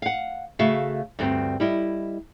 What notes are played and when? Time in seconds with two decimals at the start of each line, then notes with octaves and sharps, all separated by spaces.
0.02 F5 F#5
0.59 C#3 A3 F#4 E5 F5
1.19 D2 G2 C4
1.60 G3 E4 D#5